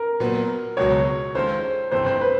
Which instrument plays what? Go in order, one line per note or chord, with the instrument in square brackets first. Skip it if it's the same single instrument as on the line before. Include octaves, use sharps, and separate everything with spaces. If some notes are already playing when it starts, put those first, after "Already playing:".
Already playing: [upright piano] A#4
[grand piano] A#2 F#3 B3
[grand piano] C#2 B2 F#3 [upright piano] C#5
[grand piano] D#3 G#3 C#4 F4 A4 [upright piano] C5
[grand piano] G1 F2 C3 E3 A3 [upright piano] C5
[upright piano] C5
B4